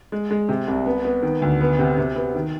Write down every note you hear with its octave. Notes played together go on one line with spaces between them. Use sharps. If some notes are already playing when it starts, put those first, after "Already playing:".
G#3
G#3
C3
C2
B3
B3
D#3
D2
B3
C3
C3
B3
D#3